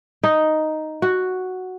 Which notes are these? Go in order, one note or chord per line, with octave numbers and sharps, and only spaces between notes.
D#4
F#4